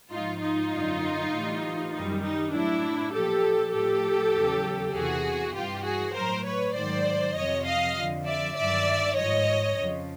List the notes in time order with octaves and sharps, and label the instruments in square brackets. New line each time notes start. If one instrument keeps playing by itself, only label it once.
[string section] G#2 F3 D#4 F4
D#4 F4
F#2 D3 F#3
A2 E3 G3
F#2 D#3 G3 D#4
D#4
A2 F#3 D4 E4
A#2 F3 G4 A4
A2 F3 G4 A4
E2 C#3 F#3
E2 C3 E3 F#4 G#4
G2 E3 G3 F4 G4
F#4 G#4
A2 F#3 A#4 C5
B4 C#5
G#2 D#3 F#3 C5 D5
F2 C3 F3 C#5 D#5
D#5 F5
F2 D3 F3
D5 E5
G2 D#3 F#3 D5 E5
G#2 F3 C#5 D#5
F2 C#3 F3